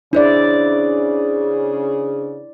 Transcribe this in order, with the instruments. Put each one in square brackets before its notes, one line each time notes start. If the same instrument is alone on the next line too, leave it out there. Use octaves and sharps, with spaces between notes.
[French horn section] C#3 G#4 [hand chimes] D4 C5 [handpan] E4 D5